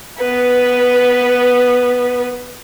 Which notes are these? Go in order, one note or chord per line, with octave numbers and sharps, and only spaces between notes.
B3 B4